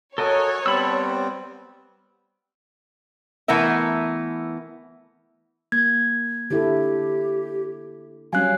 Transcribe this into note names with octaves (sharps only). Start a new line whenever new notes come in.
F#4 A4 A#4 C#5 D#5 G#5
G3 B3 C4 A5 B5 E6
E3 A3 B3 A#4 E5
A#3 G#6
D3 E4 G4 A4
F#3 G3 C#4 F5 G#5 F#6